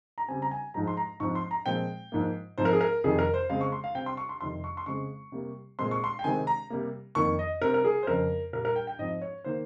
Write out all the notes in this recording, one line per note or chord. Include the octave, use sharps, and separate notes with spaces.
A#5
C#3 G3 C4 G#5
A#5
G#5
G#2 F3 G#3 A#5
C6
A#5
G#2 F3 C4 C#6
C6
A#5
A#2 F3 G#3 C4 G5
G#2 F3 A#3
G#2 F3 C4 C5
A#4
G#4
A#4
F2 C3 D#3 G3 G#4
A#4
C5
C#3 G#3 C4 F5
C#6
C6
F5
C3 G3 C4 G5
C6
C#6
C6
F2 C3 D#3 G3 C6
C#6
C6
C#3 G#3 C4 C#6
C3 G3 A#3
A#2 G#3 C4 C6
C#6
C6
G5
C3 D#3 G#3 C4 G#5
A#5
C3 G3 A#3
F2 D#3 A#3 C#6
D#5
C3 G3 C4 A#4
A#4
G#4
C5
F2 C#3 F3 C4 A#4
A#2 G3 A#3 A#4
A#4
G5
G5
G#2 F3 C4 D#5
C#5
D#3 A#3 C5